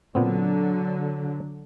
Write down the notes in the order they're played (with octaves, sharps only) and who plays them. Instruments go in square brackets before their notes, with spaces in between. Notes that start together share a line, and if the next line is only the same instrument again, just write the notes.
[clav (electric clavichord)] A#2 B3 C4 [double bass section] D3 F#3